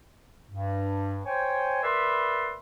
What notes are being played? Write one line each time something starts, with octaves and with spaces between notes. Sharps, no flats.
G2
C5 C#5 G5 G#5
A#4 B4 D5 E5 B5 C6